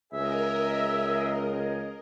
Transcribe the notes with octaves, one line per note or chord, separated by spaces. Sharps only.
C#2 G#4 A#4 D#5 E5